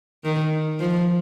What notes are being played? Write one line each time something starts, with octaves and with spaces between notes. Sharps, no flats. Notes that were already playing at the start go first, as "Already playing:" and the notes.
D#3
F3